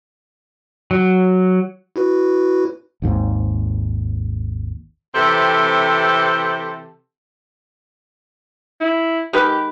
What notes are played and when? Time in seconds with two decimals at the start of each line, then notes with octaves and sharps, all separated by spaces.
0.91 F#3
1.96 E4 F#4 B4
3.02 G#1 D#2 G#2
5.15 C3 E3 C4 G4 A4
8.81 E4
9.33 D#3 G#3 G4 B4